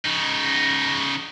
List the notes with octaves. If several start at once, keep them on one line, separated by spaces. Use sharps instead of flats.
C#3 D#4